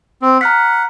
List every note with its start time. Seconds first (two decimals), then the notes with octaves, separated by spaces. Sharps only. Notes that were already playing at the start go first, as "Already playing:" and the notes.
0.22 C4
0.41 F#5 A#5 F6 B6